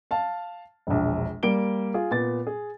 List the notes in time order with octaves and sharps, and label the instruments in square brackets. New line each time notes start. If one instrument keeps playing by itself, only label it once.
[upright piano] F5 A5
E1 A#1
G3 A#3 D7 G7
F4 G#4
A#2 B3 A6
G#4